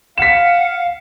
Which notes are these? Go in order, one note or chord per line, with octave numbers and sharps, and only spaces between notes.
F5 F#5 B6 E7